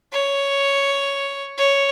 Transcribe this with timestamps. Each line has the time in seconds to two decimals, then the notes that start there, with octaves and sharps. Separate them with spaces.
0.12 C#5
1.58 C#5